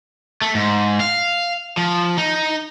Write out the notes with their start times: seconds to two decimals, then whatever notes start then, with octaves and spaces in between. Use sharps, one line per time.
0.42 A3
0.55 G#2
1.00 F5
1.77 F3
2.18 D#4